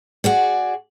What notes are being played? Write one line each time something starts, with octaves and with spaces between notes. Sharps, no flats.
F#4 G#4 D5